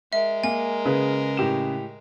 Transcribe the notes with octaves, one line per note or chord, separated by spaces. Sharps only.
G#3 A#4 E5
A#3 G#5
C#3 G#4 B4
A2 G4 E7